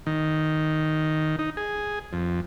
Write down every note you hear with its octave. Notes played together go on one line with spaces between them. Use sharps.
D#3
D#4
G#4
F2